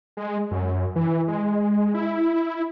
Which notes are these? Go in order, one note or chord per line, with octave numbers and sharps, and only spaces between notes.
G#3
F#2
E3
G#3
E4